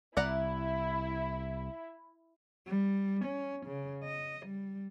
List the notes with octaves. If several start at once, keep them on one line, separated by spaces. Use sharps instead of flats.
C2 E4 D5 F#5 A#5
G3
C#4
C#3
D#5
G3